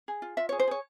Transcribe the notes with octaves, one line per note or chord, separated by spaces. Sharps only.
G#4
F4
F4 E5
C#5
G#4
C5
G#4 C#5